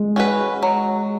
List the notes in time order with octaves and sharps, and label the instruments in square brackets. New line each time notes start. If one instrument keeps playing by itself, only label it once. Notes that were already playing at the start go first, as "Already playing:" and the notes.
Already playing: [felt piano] G#3
[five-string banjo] C#4 F#4 B4
F#3